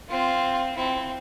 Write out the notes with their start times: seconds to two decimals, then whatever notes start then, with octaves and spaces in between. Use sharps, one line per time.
0.10 C4 F4
0.76 C4 E4